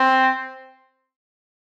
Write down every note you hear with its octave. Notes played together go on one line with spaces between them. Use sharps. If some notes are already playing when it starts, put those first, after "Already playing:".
Already playing: C4